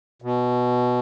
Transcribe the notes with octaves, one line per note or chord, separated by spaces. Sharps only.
B2